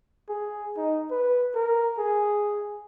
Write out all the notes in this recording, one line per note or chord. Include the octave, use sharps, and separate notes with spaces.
G#4
D#4
B4
A#4
G#4